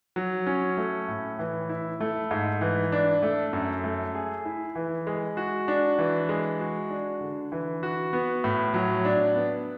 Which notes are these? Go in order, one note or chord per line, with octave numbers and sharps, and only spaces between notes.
F#3
C#4
A3
A2
E3
E4
A3
G#2
E3
D4
A3
F#2
A3
G#4
E4
E3
G#3
F#4
D4
E3
G#3
F#4
D4
D3
E3
F#4
B3
A2
F#3
D4
B3